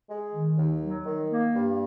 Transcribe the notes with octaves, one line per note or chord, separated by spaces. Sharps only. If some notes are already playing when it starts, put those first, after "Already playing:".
G#3
D#3
D#2
F#3
D#3
A#3
G2